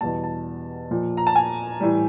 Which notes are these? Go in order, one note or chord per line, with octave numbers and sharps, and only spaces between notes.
E2 B2 G3 A5
A5
A#2 F3
A#5
A5
G#5
A2 E3 G3